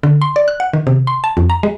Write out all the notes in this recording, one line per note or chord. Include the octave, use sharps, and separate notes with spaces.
D3
C6
D5
F#6
F#5
D#3
C3
C6
A5
F2
A#5
G#3